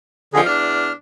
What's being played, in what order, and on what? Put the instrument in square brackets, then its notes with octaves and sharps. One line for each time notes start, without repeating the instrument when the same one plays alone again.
[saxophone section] F2 D#3 F3 [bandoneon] D3 G#4
[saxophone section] E2 D4 [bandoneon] F6